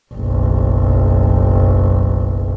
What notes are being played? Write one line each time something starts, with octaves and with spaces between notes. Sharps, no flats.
F#1 B1